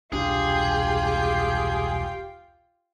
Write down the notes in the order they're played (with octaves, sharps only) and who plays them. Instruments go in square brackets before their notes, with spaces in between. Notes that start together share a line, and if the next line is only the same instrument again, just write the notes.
[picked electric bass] E1 C2 D4 [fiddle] F4 G5 [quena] G4 [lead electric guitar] G#4